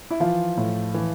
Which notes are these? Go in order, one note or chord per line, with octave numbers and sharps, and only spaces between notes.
E4
E3 F3 F4
A2
E3